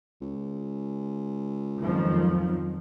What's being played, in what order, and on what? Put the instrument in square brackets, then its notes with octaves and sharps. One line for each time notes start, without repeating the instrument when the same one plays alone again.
[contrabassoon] C#2
[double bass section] F2 D#3 F3 [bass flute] F#3